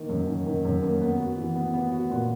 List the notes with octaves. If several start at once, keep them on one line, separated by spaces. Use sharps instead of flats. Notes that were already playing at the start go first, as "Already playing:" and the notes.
Already playing: D#3 A#3
F#2
D#3
D#3
F#2
A#3
B3
F#4
E3
B3
B3
F#4
A#2